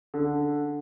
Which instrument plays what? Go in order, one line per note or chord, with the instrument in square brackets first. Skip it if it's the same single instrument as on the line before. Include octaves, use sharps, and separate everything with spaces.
[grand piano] D3